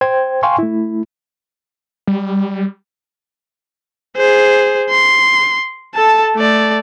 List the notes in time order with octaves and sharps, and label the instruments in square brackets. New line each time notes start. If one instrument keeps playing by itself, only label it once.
[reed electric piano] C5 G5 G#6
F5 G5 G#5 C6 C#6
A3 E4
[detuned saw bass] G3
[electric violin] G#4 C5
C6
A4 A5
A3 D5